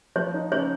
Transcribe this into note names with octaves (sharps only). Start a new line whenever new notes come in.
F3 C#5
D#4
C#3 C#5